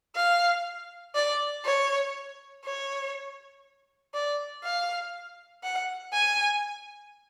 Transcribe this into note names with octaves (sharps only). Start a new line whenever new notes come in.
F5
D5
C#5
C#5
D5
F5
F#5
G#5